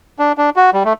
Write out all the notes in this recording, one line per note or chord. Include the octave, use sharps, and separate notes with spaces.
D4
D4
F#4
G3
A3